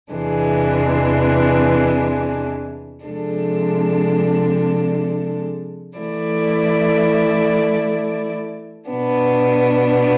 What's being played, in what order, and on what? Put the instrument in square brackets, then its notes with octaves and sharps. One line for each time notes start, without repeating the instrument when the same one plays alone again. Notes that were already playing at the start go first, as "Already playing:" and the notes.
[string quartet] E2 C3 E3 G#3 D4
C3 F3 G#3 D4 A4
E3 A3 E4 A4 D5
B2 B3 D4